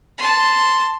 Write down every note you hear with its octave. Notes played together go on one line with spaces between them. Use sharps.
A5 C6